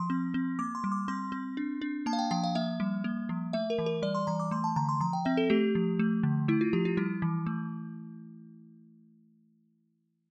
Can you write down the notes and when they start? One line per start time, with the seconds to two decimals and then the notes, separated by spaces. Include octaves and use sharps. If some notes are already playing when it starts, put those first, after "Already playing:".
Already playing: F3 C6
0.10 C4
0.34 C4
0.59 A#3 D6
0.75 C6
0.84 G3
0.92 D6
1.08 C4 C6
1.32 C4
1.57 D4
1.82 D4
2.06 A#3 A5
2.13 F5
2.19 G5
2.31 F3 G5
2.43 F5
2.55 A#3 E5
2.80 G3
3.04 A#3
3.29 F3
3.53 A3 E5
3.70 A#4
3.78 E3
3.86 A#4
4.02 G3 D5
4.15 C6
4.27 E3 A#5
4.40 D6
4.51 A3 C6
4.64 A5
4.76 D3 A#5
4.89 C6
5.01 F3 A#5
5.13 G5
5.25 C4 E5
5.37 A4
5.50 A3 G4
5.75 F3
5.99 A3
6.23 D3
6.48 A3 E4
6.61 F4
6.73 F3 G4
6.85 F4
6.97 G3 E4
7.22 E3
7.47 A3